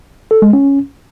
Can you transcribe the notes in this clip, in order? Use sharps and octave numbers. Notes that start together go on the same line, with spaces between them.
A4
G#3
C#4